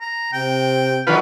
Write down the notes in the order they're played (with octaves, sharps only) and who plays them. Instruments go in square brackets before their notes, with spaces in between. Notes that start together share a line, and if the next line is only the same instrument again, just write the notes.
[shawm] A#5
[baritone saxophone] C3 [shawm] G5
[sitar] D3 D#3 F#3 [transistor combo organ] F4 B4